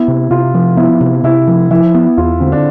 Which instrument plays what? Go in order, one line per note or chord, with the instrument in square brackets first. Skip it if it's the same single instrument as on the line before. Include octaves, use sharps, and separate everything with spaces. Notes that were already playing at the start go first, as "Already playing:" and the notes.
Already playing: [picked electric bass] B3 [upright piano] E4
[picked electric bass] C3
[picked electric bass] C3 [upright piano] F4
[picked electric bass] F3
[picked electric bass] B3 [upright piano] E4
[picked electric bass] C3
[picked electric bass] C3 [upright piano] E4
[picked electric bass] F3
[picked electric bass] F3 [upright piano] E4
[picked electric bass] B3
[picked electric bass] E2 [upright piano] F4
[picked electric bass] D3 [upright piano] C4
[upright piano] D4